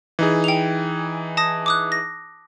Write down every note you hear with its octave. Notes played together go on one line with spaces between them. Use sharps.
E3 D#4 G#4
G5 F7
A5 D#6 A#6
D6 D#6 F#6
A#6